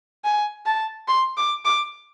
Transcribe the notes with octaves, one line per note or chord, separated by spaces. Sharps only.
G#5
A5
C6
D6
D6